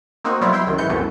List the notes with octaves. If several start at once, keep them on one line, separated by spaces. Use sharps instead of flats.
A#3 C4 D#4 F#4
B2 F#3 G3 B3 E4 F4
E4 G5 C6
C2 F#2 D#3
G#2 E3 G6 C#7
C2 F#2 B2 E3 A3